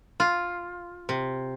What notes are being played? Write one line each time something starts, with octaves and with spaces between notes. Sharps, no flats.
F4
C3